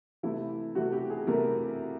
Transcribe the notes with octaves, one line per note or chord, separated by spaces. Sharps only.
C3 E3 A3 E4
C3 E3 A3 F#4
G4
G#4
C3 E3 A3 A#4